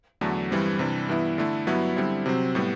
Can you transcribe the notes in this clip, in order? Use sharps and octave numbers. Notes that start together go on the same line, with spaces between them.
E2 D3 F#3 A3
G2 E3 G3 C4
C3 E3 G3 D4
G2 E3 B3 E4
D3 A3 E4
G2 F#3 B3 E4
D3 G3 C4 E4
C3 F#3 C4
A2 G3 B3